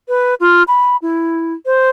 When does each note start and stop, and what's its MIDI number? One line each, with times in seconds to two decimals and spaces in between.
0.08 0.34 71
0.40 0.63 65
0.68 0.96 83
1.02 1.54 64
1.66 1.90 72